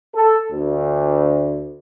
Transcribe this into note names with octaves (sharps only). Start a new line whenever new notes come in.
A4
D2